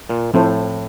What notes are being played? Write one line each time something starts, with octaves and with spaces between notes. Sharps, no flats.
A#2
A2 F3 C4 E4 A4 C5